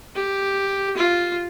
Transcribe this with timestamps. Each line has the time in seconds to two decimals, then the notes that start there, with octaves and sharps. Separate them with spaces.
0.15 G4
0.97 F4